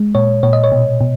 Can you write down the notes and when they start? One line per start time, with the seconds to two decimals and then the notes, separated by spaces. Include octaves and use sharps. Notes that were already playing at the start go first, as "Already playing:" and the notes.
Already playing: G#3
0.15 A#2 C#5
0.43 A#2 C#5
0.53 D#5
0.64 C#5
0.72 B2
1.01 B2